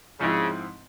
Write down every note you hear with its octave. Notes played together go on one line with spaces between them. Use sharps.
G#2 C#3 F3 G#3 C4 E4